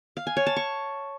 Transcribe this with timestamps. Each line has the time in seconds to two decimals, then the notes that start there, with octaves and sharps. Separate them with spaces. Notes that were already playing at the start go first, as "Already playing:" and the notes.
0.17 F5
0.27 G#5
0.37 C#5
0.47 A5
0.56 C#6